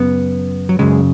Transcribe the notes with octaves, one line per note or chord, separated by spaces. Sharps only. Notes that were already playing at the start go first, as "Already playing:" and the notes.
Already playing: F#2 C#3 B3
F#3
F#2 C#3 G#3